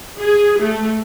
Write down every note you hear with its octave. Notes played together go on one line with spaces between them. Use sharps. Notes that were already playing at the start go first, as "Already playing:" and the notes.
G#4
A3